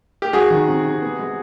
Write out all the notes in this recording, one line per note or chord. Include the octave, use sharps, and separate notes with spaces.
G4
G#3 F#4 G#4
D#3
C3
C3
B3
G#3